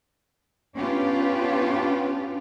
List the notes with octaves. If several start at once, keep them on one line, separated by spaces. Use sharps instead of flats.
B3 C#4 D4 F4 G4 B4